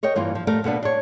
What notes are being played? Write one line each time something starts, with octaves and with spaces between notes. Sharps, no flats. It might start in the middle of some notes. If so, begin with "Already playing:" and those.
A#4 C#5 D#5 G5
G2 E3 A#3 F4
F3
G3 A3 A#4 F5
B2 A#3 B3 D4
D4 C#5